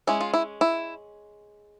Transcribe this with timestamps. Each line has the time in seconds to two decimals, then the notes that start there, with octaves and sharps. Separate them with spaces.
0.07 G#3 C#4 E4
0.21 F4
0.34 E4
0.61 E4